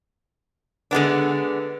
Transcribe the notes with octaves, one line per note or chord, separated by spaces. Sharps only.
D3 G#3 B3 D4